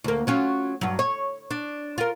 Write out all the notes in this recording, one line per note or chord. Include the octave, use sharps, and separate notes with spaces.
D2 A#3
F#3 C#4 F4
G2 F#3
C#5
D4
F4 A#4